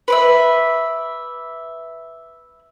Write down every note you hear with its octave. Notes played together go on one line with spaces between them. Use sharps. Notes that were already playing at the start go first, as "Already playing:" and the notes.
B4 D5 E5